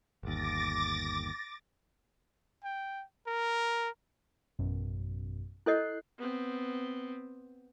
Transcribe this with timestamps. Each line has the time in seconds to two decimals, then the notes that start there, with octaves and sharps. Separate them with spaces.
0.23 G1 D#2 D6 A6 A#6
2.64 G5
3.27 A#4
4.59 A1 F#2 B2
5.66 E4 A4 D#5 F#6 G6 C7
6.19 B3 C4